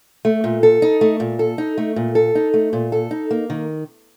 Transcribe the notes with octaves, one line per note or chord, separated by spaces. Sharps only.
A3
A#2
A4
D#4
A3
A#2
A4
D#4
A3
A#2
A4
D#4
A3
A#2
A4
D#4
A#3
D#3